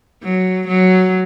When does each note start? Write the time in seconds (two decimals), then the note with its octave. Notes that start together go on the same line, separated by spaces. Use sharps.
0.23 F#3
0.68 F#3